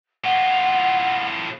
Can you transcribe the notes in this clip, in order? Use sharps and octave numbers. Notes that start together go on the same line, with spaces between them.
A2 F4 F#5